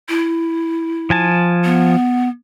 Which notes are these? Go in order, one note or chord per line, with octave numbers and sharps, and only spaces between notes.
E4
F3 G#5 A5
B3